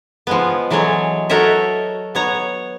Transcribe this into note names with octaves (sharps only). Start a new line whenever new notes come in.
F3 G#3 B3
E3 F#3 G#3 A4 C#5
F#4 A4 A#4 C#5 D#5 E5
B3 C#5 A#5